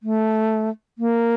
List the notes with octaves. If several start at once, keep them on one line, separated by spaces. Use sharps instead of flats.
A3
A#3